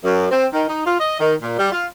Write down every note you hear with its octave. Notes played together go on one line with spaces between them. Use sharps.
F#2
C4
D#3
D#4
F4
D#5
D#3
A#2
G3
F4